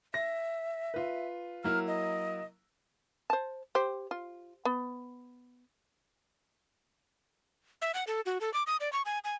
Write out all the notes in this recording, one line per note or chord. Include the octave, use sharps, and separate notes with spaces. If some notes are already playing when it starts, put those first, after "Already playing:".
E5 A#6
F4 B4
F#3 A#3 E4 F6
D#5
C5 A5
G4 C5
F4
B3
E5
F#5
A4
F#4
A4
D6
D#6
D5
C#6
G#5
G#5